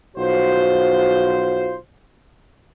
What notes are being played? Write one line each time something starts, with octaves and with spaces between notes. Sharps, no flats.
B1 F4 F#4 C5